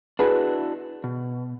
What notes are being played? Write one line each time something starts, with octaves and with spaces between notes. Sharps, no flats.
B3 D4 E4 F#4 G#4 B4
B2